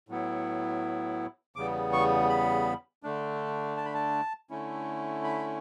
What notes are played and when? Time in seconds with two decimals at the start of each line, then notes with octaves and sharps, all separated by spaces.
0.09 A2 F#3 B3 E4
1.56 E2 C#3 G3 B3 D6
1.93 C#6
2.29 B5
3.03 D3 A3 D4
3.77 A5
3.85 B5
3.94 A5
4.50 D3 A3 C#4 E4
5.24 B5